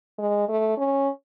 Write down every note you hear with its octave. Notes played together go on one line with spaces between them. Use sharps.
G#3
A3
C#4